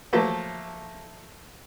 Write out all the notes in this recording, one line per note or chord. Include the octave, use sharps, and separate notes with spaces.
F3 F#3 A3 A#3